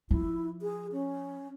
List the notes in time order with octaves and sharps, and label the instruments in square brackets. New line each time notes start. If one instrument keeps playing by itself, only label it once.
[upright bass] F3 [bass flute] E4
[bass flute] G#4
C#4